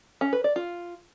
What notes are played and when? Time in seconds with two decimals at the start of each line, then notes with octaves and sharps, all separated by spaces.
0.21 C#4
0.33 B4
0.44 D5
0.56 F4